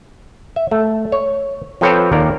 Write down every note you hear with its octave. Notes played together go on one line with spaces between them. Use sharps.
E5
A3
C#5
F3 C4 A4 B4 C#5 G5
D#2 A#4 D5